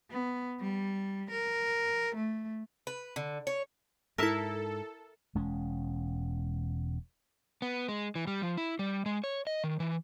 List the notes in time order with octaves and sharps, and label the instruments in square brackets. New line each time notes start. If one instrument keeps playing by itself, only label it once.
[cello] B3
G3
A#4
A3
[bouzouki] B4
D3
C#5
[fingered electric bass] G#2 [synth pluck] E4 A5 [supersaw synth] A4 [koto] A#4 E5
[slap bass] E1 G#3 C#4
[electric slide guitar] B3
G#3
E3
G3
F3
E4
G3
G#3
C#5
D#5
D#3
E3